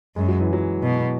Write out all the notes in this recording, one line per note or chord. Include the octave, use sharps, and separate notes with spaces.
F#2 G#3
F#3
E3
F#3
B2